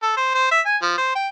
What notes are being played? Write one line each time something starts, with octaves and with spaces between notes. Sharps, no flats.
A4
C5
C5
E5
G#5
F3
C5
G5